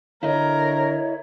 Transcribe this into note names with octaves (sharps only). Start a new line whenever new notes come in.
D3 E4 A#4 C#5 D#5